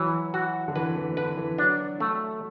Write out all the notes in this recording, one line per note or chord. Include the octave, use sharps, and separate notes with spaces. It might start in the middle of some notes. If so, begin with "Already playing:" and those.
Already playing: E3 F#3
F#4
D3
E3 B4
E3
D3 B4
E3
F#3 D4
A3